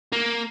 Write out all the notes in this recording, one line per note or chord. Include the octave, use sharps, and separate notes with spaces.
A#3